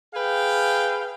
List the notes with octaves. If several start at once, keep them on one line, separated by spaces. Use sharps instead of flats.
G#4 B4 F5 G5